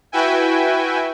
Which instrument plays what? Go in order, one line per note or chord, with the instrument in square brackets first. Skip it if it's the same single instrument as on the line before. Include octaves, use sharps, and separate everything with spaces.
[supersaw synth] E4 F#4 B4 E5 G5 G#5